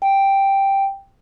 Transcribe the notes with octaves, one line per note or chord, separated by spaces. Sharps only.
G5